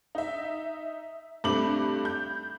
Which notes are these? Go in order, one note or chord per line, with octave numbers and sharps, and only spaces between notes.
D#4 E5
G2 A3 C4 D6 F#7
G6